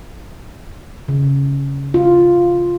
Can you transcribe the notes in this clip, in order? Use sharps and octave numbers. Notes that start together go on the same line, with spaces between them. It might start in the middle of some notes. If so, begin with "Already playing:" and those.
C#3
F4